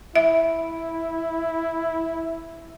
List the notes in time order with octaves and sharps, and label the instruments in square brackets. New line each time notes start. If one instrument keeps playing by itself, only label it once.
[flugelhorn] E4 [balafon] E5